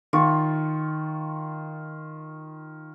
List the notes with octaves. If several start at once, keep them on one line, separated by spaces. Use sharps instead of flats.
D#3 F4 C#6